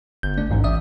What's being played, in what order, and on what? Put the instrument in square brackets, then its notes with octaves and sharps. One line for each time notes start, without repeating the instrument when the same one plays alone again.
[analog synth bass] G1 [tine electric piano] G6
[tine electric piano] A3 D4 D5
[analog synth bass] A1 [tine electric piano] D#2 G#2 E3
[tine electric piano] D5 E5 D#6